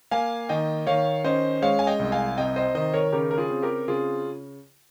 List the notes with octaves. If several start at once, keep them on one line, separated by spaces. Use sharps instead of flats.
A#3 F5 G#5
D#3 D#5 G5
D#3 C#5 F5
C#4 C5 D#5
G#3 C#5 F5
G#5
D#5 G5
C2
F5 G#5
C3 D#5 G5
C5 D#5
D#3 C5 D#5
A#4 C#5
C#3 G4 A#4
A#4
F4 G#4
C4
G4 A#4
C#3 F4 G#4